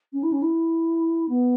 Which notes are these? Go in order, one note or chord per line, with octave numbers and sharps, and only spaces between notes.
C#4
E4
C#4
E4
B3